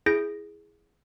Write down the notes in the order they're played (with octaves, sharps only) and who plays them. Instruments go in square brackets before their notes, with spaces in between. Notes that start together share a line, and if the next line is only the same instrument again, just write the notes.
[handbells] E4 G#4 G6 A#6 D7